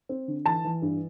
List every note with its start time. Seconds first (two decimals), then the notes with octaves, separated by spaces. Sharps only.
0.09 C4
0.28 D3
0.46 E3 A5
0.65 E3
0.82 G2